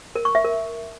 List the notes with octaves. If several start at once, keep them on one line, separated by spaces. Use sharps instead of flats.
A#4
C#6
E5
A#4